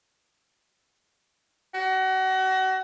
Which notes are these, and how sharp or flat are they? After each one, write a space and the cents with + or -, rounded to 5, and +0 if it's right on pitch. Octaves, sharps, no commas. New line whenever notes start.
F#4 +30